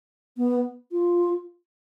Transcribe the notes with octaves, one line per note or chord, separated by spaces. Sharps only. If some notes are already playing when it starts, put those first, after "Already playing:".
B3
F4